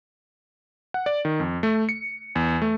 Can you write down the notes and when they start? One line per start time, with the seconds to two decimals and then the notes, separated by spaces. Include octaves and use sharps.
0.94 F#5
1.06 D5
1.25 D#3
1.40 F2
1.63 A3
1.89 C#7
2.35 E2
2.62 A3